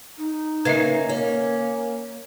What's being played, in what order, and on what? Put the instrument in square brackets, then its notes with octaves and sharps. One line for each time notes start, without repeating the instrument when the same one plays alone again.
[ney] D#4
[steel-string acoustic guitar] C#3 A#3 [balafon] B4 D#5 E5
[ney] A#3 [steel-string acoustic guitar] C#4